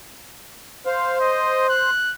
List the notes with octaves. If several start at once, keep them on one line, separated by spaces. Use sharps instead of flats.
C5 F5
D#5
F#6